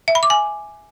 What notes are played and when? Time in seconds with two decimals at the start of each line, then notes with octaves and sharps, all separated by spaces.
0.08 E5
0.15 B5
0.23 D6
0.30 G#5